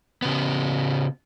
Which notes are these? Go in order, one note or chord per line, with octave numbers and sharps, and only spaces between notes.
C#3 B3